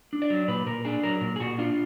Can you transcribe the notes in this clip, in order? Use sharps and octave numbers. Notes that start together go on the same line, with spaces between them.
D4
D5
F#3
A#2 B4
A#2 A#4
D4 G#4
F#3 A#4
A#2 A#4
G#4
A#2 F#4
D4 F4